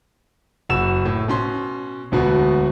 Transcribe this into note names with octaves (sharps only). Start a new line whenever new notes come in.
F#1 F#4 E6 E7
A2
B2 C#4 C6
E1 D2 B2 B3 F#4